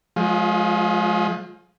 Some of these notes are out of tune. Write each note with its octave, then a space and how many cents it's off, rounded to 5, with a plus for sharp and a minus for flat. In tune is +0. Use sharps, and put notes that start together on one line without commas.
F3 +40 G#3 +30 F4 +0